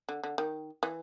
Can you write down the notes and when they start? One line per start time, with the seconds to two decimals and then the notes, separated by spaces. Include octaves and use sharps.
0.09 D3
0.23 D3
0.38 D#3
0.83 E3